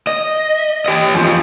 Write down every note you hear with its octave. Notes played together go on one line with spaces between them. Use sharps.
D#5
G4 D#5
E2 F3